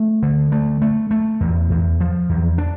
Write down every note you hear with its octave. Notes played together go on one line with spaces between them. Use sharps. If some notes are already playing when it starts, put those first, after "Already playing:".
Already playing: A3
D3
A3
A3
A3
E2
E2
F3
E2
D4